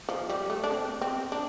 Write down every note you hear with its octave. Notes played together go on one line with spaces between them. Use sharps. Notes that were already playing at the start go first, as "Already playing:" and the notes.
F3
G3
A3
D4
C4
C4
D4